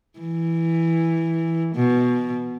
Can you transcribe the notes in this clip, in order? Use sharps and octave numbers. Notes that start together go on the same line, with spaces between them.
E3
B2